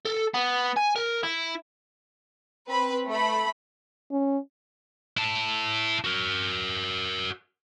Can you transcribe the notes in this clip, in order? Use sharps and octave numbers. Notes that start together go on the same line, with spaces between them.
A4
B3
G#5
A#4
E4
C4 B4 B5
A3 B5
C#4
E4 A5
F#4 A#4